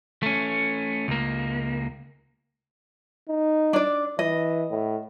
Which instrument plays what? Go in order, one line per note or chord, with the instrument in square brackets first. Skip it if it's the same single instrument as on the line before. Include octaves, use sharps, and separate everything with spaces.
[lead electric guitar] A3 C#4
C#2 A#3
[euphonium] D#4
[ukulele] D4 D5
[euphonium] E3 [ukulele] D#5
[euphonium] A2